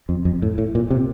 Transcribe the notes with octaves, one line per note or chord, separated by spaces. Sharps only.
F2
F2
A2
A2
A#2
C3